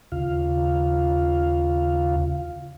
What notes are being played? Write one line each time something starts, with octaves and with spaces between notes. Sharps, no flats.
D#2 C#3 F4 F5